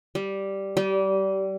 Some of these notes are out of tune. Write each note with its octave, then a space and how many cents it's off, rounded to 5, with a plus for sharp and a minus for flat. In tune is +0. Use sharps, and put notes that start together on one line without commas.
G3 -5
G3 -25